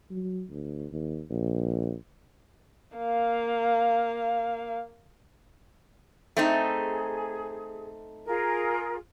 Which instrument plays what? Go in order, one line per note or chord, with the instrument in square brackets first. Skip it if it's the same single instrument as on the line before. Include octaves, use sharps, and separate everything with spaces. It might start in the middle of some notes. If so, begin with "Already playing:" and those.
[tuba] F#3
D2
D#2
A#1
[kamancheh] A#3 F5
[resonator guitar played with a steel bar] A3 C4 D#4 [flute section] G#4
[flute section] F4 G#4 A#4